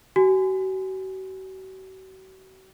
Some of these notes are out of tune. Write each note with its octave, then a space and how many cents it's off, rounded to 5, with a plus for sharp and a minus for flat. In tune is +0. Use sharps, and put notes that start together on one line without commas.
F#4 +40 G#5 +0